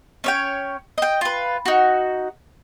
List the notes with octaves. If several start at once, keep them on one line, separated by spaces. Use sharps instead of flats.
C#4 C#5 G5
D#5 G5
F4 B4
D#4 F#4